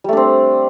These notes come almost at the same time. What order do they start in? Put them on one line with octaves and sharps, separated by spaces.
G3 A3 D4 C4